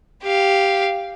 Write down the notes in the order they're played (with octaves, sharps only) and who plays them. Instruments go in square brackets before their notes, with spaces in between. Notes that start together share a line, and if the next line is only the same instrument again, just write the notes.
[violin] G4 F5